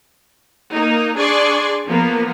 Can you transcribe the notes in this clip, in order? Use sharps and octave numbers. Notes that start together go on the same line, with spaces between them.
A#3 D#4
D4 G#4 D5 C6 C#6
F3 A#3 B3